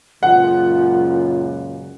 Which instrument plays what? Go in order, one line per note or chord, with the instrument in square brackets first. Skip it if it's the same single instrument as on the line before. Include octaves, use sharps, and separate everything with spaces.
[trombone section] C#2 F#2 A#2 [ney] F4 [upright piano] F#5